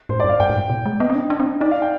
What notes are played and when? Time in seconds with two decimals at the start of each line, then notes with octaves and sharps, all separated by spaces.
0.09 G#2 C5
0.20 G2 D5
0.29 F5
0.40 G2 G5
0.50 G#2
0.54 G2
0.70 B2
0.86 G#3
1.00 B3 D#5
1.10 C4
1.15 D4
1.30 D4
1.40 C4
1.46 D4
1.60 D#4 D5
1.71 F5
1.82 G5